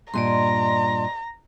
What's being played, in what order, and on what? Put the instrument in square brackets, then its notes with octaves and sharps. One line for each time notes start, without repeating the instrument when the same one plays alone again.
[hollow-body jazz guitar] G2 A#2 [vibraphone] D5 D#5 C6 [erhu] A#5